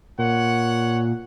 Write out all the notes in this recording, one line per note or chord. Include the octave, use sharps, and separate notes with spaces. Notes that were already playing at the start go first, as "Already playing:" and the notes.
A#2 C#5 F#5